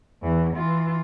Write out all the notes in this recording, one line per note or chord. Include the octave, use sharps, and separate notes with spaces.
E2 E3
E3 F4